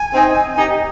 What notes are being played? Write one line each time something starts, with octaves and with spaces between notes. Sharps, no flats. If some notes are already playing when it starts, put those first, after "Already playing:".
Already playing: G#5
C4 D#4
D#4 G4